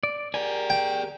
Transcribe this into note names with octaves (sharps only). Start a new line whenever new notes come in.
D5
G4 G#4 A#4 D5 G#5
G5